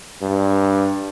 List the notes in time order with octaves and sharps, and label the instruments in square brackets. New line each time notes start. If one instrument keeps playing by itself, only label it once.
[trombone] G2